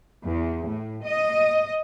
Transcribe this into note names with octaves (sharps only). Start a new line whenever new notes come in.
E2
A2
D#5